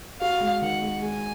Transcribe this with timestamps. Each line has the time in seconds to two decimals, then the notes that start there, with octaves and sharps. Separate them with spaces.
0.21 F#4 F5
0.41 G#3
0.61 D#3 F#5
0.82 G#3
1.02 G#3 G#5